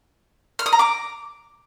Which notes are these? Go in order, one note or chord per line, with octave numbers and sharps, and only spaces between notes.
F6
D#6
A#5
D6